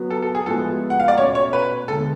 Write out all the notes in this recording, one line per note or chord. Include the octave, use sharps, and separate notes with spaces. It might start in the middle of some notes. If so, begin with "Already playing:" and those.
Already playing: F#3 B3 F#4
A4
A4
G#4
A2 F3 G#3 B3 F#4 A4
F#5
F5
D5
B2 A3 C#4 C#5
C#5
B4
D3 G#3 B3 A4